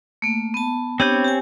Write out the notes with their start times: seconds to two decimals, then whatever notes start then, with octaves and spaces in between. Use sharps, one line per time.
0.22 A3 A#3
0.54 B3 A5
1.00 B3 C4 D4 G4 C#5 G6
1.24 G4 G#5